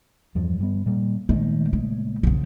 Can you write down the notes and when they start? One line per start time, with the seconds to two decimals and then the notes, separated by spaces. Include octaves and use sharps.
0.35 E2 G2 F3
0.59 G2 G3 B3
0.86 A#2 G3 A#3
1.29 A#2 D#3 G#3 A3
1.73 C#3
2.23 A#1 E2 C#3 F3